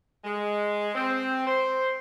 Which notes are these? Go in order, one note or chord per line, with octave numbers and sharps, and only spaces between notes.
G#3
C4
C5